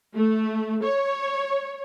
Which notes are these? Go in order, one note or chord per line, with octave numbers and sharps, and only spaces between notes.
A3
C#5